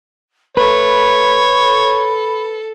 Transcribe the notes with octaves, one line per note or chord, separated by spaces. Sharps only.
A3 B4 C#5 B5
A4